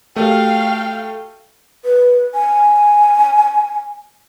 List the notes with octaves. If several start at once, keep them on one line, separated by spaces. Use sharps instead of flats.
A3 F#4 G4 A#4 F5 G5
B4
G#5